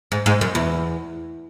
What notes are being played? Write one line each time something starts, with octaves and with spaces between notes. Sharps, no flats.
G#2
G#2
F#2
E2